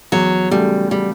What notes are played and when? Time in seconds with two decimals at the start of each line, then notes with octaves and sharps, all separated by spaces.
0.12 E2 F#3
0.51 C#3 F#3 G3 A3
0.91 G3